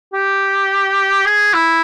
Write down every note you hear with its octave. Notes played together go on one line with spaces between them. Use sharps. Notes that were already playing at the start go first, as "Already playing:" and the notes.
G4
G#4
E4